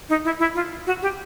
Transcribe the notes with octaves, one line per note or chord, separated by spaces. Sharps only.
D#4
E4
E4
F4
F#4
G4